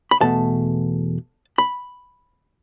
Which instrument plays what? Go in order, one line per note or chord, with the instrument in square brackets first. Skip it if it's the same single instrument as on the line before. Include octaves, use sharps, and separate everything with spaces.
[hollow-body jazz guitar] B5
E2 B2 A3 A5
B5